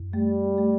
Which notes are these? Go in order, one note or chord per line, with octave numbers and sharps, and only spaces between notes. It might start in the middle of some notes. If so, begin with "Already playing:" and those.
Already playing: F#2
G3 A3
A3